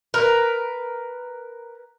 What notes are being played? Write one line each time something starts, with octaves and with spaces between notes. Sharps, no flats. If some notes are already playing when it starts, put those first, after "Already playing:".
A#4 B4